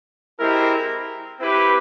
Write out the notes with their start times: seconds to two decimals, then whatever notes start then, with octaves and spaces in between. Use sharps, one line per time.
0.40 G#3 C4 E4 G4 A#4
1.40 C4 E4 G4 B4